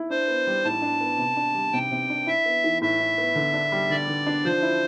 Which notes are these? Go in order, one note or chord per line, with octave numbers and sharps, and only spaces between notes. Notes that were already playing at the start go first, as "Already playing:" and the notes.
Already playing: E4
D4 C5
B3
G3
A2 A5
D4
B3
C3
D4
G3
C3 G5
C3
D4
E4 E5
B3
E3
A2 E5
E4
B3
D3
D4
G3
D3 D5
D3
D4
F3 C5
E4